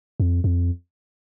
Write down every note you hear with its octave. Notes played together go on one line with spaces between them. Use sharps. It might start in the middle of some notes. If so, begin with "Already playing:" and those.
F2
F2